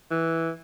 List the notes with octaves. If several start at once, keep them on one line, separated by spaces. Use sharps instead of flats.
E3